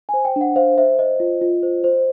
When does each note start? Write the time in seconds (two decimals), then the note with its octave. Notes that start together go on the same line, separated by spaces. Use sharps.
0.09 C5 G#5
0.25 G5
0.36 D4
0.41 F#5
0.56 C5 F5
0.78 C5 E5
0.99 C5 D#5
1.20 F4
1.41 F4
1.63 C5
1.84 C5